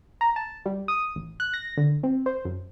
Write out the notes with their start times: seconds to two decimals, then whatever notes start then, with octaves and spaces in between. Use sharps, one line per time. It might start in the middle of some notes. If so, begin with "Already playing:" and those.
0.21 A#5
0.36 A5
0.66 G3
0.88 D#6
1.16 A1
1.40 F#6
1.54 A#6
1.77 D3
2.03 C4
2.26 C5
2.45 F#2